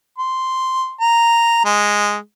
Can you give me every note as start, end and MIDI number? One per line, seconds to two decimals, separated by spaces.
0.18 0.92 84
1.01 1.61 82
1.65 2.18 56